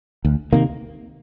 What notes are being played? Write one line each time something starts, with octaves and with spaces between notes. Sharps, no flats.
D2
C3 D#3 A#3